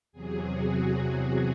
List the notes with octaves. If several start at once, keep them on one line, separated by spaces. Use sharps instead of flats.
E2 C3 F#3 G#4
F#4
G#4